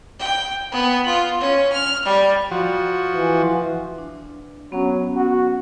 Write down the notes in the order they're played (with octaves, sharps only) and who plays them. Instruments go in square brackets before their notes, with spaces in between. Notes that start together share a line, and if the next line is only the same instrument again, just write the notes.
[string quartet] G5
B3
F4
C#4
F6
G3
[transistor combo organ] F3 F#4
[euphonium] E3
[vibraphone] D4
[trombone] F#3 [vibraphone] B3 C#4
[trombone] F#4